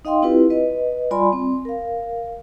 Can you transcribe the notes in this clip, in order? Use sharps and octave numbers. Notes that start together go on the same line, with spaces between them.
D#4 D#5 F5 G5 C6
C4 E4 F4 G4 B4
B4 D#5
G3 F4 D5 G#5 B5 C6
C4
A#4 F5